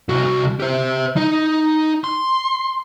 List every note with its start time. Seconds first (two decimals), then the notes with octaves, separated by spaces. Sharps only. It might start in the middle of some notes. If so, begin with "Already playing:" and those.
0.09 C2 F#4
0.60 G4 C5
1.17 D#4 D#5
2.04 C6